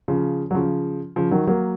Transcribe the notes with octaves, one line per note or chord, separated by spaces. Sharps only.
C#3 F3
F#3
C#3 F3
C#3 F3
D#3 F#3
F#3 A#3